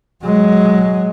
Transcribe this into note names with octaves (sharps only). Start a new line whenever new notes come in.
F#3 G#3